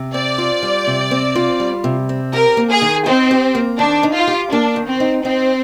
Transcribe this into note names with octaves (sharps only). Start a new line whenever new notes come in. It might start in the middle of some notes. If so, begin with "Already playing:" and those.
Already playing: C3
C4 D5
F4
G3
C3
C4
F4
G3
C3
C4
G4 A#4
A#3
G#4
D#3
C4 D#4
G4
A#3
D#3 D4
D#4
F4
G4
A#3 D4
D#3
C4
D#4
C4 D#4